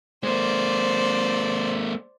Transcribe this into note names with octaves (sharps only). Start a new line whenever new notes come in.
G#3 A#3 C5 D5